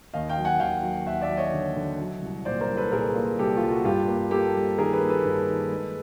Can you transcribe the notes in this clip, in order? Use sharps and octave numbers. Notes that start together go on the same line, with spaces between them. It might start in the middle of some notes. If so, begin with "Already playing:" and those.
D#2 D#5 F5
F5 G5
F#3
F#5 G#5
D#2 F5 G5
F#3
D#2 E5 F#5
D5 E5
F#3
C#5 D#5
D3
D3
F#3
C2
A#2 C5 D5
A#4 C5
C2
A4 B4
A#2 G#4 A#4
A#2
C2 G4 A4
F4
C2
F#4
G2 F4 G4
A#3
A#3 G4 A4
G3
D#3 G#4 A#4
A4 B4
A#3
A4 B4
G2
D#3
G#3